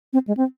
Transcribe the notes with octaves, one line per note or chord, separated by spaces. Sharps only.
C4
G#3
C4